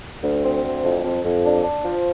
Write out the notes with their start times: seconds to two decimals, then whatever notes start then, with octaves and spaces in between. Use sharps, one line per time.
0.23 D2
0.44 C4
0.64 D2
0.83 F2
1.03 F2
1.24 F2
1.45 D4
1.63 D4
1.85 F3